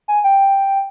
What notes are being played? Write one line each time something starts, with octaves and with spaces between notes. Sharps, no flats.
G#5
G5